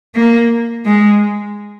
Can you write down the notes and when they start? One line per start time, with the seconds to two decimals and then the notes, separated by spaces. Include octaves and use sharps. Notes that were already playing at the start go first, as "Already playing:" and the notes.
0.16 A#3
0.86 G#3